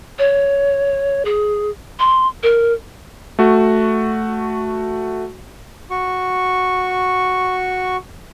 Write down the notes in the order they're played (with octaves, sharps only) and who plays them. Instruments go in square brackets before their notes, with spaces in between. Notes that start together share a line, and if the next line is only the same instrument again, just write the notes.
[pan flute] C#5
G#4
C6
A#4
[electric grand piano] A3 F#4
[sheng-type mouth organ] F#4 C#6